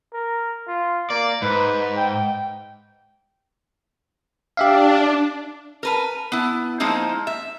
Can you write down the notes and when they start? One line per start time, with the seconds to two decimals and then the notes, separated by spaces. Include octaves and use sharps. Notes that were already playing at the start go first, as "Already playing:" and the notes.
0.14 A#4
0.68 F4
1.10 A#3 D5
1.42 G#2 B4
1.97 G5
4.57 D4 G4 E5 F5
5.83 A#4 B4 G#5
6.32 B3 E4
6.80 F3 G#3 A#3 C4 D#4 E4
7.27 E5